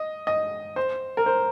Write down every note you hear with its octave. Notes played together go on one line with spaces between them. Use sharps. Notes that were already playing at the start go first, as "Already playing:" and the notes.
Already playing: D#5
D#5
C5
A#4
C5